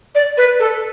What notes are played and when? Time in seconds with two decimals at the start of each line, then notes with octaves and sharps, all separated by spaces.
0.15 D5
0.37 B4
0.60 A4